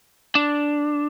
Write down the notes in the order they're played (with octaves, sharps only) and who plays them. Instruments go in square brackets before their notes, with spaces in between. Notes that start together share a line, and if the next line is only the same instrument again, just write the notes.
[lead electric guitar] D4